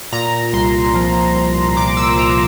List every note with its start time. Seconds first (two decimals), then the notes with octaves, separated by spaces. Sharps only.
0.12 A#2 A#5
0.53 C2 C6
0.94 F3
1.35 C2
1.76 A#2 D6
1.97 E6
2.17 C2 A#5